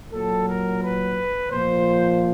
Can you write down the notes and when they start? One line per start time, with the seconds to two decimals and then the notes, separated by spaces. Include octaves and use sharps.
0.12 A#2 F#3 A4
0.47 A#4
0.82 B4
1.52 A#2 F3 C5